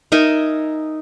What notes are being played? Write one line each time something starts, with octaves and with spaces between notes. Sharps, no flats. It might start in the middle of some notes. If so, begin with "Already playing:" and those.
D#4 A#4 E5 G#5